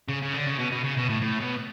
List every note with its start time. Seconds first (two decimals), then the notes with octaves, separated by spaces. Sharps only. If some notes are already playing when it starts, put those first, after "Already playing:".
0.09 C#3
0.22 C#3
0.34 D3
0.47 C#3
0.59 B2
0.72 B2
0.84 C#3
0.97 B2
1.09 A2
1.21 A2
1.40 B2